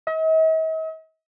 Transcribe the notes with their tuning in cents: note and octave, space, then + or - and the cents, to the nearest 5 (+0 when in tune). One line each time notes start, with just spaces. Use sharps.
D#5 +45